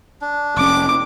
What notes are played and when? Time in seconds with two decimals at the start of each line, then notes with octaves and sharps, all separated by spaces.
0.22 D4
0.57 F1 C#4 D6